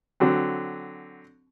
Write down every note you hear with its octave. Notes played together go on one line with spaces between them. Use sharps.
D3 F#3 C4